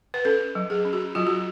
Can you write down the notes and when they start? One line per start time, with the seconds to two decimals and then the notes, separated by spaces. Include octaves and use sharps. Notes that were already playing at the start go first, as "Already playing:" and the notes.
0.14 B4
0.25 C#4 A4
0.55 F#3
0.70 G#4
0.85 C#4
0.93 F#4
1.15 F#3 F4
1.27 F#4